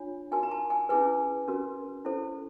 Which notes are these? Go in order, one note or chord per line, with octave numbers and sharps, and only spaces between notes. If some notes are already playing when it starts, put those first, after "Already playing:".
Already playing: D4 F4 C#5
D#4 F#4 A#4 G#5
A#5
A5
G#5
C#4 E4 G#4 B4 G#5
C#4 F#4 A#4
C#4 E4 A4 C5